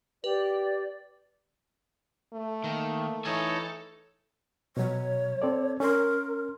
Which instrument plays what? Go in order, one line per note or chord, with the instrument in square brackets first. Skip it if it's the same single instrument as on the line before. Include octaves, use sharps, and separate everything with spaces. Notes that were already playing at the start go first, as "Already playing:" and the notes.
[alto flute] G4 [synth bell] B4 [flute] D5
[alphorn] A3
[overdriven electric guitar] D#3 [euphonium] A#3
[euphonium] E3 [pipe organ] D#4 C#5 [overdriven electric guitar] A4 G#5
[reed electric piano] B2 F#3 [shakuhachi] C#5
[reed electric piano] C4 A4 D5
[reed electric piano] C#4 C6 [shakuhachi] A#4